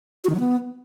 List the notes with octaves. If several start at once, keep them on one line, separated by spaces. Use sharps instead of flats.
F#4
D#3
F#3
B3